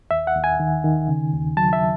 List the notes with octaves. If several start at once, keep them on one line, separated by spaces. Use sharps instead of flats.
D#2 E5
F#5
D#2
G#5
D#3
D#3
C#3
D#2
F#3 A5
E5